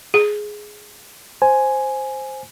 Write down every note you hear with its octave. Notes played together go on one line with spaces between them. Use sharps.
G#4
C5 G#5